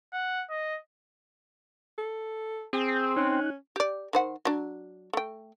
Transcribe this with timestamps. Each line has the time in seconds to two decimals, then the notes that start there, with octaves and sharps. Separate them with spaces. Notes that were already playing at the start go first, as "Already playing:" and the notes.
0.13 F#5
0.50 D#5
1.98 A4
2.73 C4 G#4
3.16 C#4 D#4 F#6
3.76 G4 D5
4.13 D#3 C5 F#5
4.45 F#3 D4
5.13 A3 G5